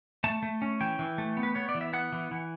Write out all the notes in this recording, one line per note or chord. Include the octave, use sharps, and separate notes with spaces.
A3 A5
A3
C#4
E3 G5
E3
A3
B3
B4
B3 C#5
D5
E3
E5
B3 F#5
E3
E3